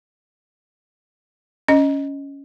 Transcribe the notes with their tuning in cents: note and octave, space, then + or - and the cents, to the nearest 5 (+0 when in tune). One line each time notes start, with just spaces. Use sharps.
C#4 +5 D#5 +0